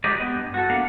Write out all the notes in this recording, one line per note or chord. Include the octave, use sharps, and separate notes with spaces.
F#3 G#3 G4 B4 D5 D#5
B3
G2
F#4 A4
A#3 B3 D4 F5 F#5